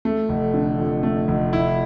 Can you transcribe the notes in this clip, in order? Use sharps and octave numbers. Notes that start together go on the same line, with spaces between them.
A3
F1
D3
F2
A3
F1
E4